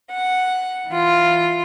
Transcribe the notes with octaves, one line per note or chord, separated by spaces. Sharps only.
F#5
E3 F4